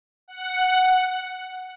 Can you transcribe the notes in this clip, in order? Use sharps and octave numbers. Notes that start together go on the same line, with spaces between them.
F#5